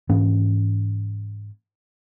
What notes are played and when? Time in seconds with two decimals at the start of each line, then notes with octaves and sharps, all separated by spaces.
0.09 G#2 E3 A#3 C#4